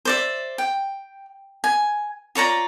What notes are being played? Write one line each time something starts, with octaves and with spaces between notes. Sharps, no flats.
C5 D5 E5
G5
G#5
F4 C#5 D5 A#5